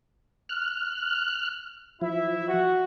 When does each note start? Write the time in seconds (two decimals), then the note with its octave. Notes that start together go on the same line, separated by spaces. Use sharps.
0.49 F6 F#6
2.02 F3 E4 E5
2.48 F#4